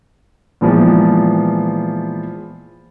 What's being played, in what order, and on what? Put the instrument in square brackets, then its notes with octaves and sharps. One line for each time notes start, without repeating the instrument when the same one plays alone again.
[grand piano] A#2 E3 F3 G#3 B3